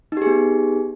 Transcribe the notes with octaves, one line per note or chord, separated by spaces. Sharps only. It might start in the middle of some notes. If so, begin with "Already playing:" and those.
B3 D#4 G4 G#4